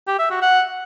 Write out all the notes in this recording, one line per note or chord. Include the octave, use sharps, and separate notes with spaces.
G4
E5
F#4
F#5